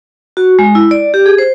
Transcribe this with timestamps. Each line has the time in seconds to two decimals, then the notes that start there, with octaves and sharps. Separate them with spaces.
0.37 F#4
0.59 G#3
0.75 E4
0.91 D5
1.14 G4
1.26 G#4
1.38 C5